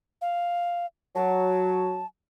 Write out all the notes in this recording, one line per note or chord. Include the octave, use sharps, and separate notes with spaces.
F5
F#3 A5